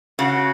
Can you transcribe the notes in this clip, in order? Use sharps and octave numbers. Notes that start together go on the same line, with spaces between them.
C#3 F#4